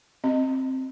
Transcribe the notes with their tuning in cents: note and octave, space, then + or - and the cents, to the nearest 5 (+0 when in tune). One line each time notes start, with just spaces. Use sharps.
C4 +5 D#5 +0